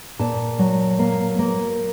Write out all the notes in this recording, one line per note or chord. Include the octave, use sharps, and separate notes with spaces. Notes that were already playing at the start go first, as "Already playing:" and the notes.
A#2 A5
F#3
A#3
A#3